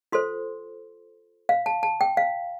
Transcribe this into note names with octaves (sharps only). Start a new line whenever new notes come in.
F4 A4 C5 C6
F5
A5
A5
G5
F5